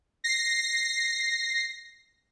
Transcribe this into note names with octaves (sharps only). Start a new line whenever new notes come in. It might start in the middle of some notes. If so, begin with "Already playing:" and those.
A#6 C7